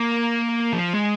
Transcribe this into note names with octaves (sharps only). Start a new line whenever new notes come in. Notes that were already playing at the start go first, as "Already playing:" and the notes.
Already playing: A#3
F3
G#3